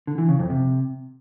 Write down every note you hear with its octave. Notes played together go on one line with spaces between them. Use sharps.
D3
E3
C#3
F2
C3